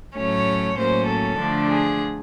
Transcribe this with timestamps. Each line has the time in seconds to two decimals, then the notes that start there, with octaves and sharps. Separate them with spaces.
0.16 A2 F#3 A3 C#4 C#5
0.77 A2 F#3 A#3 C#4 C5
1.07 A4
1.38 D3 F3 A3 D4
1.69 G#4